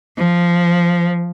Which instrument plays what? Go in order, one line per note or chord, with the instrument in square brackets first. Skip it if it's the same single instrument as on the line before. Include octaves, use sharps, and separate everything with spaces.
[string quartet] F3